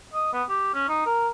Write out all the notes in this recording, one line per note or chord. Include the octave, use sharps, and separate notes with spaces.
D#5
B3
G4
C#4
D#4
A#4